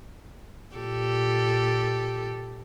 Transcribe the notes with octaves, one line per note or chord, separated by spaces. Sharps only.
A#2 G4 A4